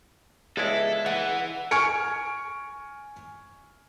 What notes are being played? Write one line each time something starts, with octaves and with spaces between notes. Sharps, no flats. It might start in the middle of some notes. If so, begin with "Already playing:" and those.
C#2 G#3 E4 G#4 A4 D5 E5
E3 F#5
G#5 C#6 F6 G#6 C#7 D7